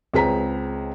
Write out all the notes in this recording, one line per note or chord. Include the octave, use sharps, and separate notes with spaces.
C#2 C4 G#4 B4 A#5 B6